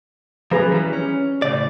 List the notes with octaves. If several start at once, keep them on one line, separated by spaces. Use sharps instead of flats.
F3 F#3 G#4 B4 A#5
E3 G3
C#4
A2 C#3 D5